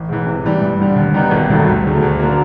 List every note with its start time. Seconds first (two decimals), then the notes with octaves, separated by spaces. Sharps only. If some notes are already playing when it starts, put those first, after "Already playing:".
Already playing: A1
0.09 G#2 E3
0.26 C3
0.44 E3 G3
0.62 G2
0.79 D3 G3
0.96 D#2
1.14 D#3 G3 B3 D#4
1.31 G#1
1.49 G2 D#3 F#3 A3
1.67 D2
1.85 C#3 F#3 A3
2.02 D2
2.19 D3 F#3 A#3